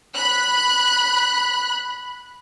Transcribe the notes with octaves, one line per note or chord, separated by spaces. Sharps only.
B5 F#6